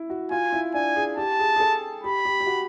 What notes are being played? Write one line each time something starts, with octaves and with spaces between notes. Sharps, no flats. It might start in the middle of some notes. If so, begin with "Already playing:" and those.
Already playing: E4
F#4
F4 G#5
E4
D4 G#5
G#4
G4 A5
G#4
G#4
A4
G4 B5
G4
G4
F#4